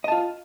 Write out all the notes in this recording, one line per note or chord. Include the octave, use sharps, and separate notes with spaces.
F4 D#5 A5